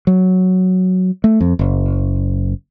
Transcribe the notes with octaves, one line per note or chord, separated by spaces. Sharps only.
F#3
A3
F2
F#1